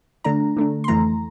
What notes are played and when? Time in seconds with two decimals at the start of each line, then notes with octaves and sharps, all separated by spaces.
0.24 D3 A3 D4 A#5
0.57 D3 A3 D4
0.84 C6
0.88 F2 E3 A3 A#5